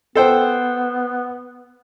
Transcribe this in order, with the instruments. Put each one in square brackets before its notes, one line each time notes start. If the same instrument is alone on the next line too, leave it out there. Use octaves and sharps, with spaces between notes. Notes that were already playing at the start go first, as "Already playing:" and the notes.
[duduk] B3 [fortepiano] A4 C5 G5